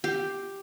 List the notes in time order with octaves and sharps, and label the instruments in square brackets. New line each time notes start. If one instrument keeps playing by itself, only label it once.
[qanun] G4